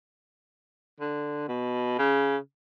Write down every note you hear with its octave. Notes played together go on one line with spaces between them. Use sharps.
D3
B2
C#3